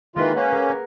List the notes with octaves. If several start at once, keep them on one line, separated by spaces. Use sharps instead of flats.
D#3 E3 G#3 A#3 F4 B4
A#3 C#4 F#5
G#4 A#4
A#4